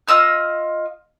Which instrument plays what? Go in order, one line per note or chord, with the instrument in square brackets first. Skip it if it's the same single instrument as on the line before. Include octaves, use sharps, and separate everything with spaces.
[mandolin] F4 D#5 E6 F6